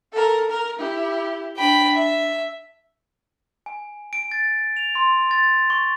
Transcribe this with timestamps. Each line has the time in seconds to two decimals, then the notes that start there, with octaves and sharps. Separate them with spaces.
0.12 A4 A#4
0.50 A#4
0.79 E4 G4
1.57 D4 G5 B5
1.95 E5
3.66 G#5
4.13 D7
4.31 A6
4.76 F7
4.95 C6
5.31 A6
5.70 C#6